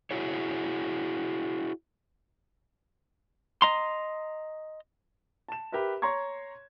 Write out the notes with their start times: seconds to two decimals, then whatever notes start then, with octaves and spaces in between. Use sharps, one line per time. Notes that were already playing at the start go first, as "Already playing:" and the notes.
0.11 E4 F#4 G#4 C#5
3.62 D#5 A#5 C6
5.48 A5 E7
5.72 G4 A#4 B4 E5
6.02 C#5 A#5 C6 C#6 G#6